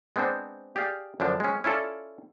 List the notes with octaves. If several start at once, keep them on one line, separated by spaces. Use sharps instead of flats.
G#3 B3 C4 D4 C5
G4 G#4 D5 F5
F#2 D3 F3 D4
G#3 C#4
C#4 E4 F4 A4 D5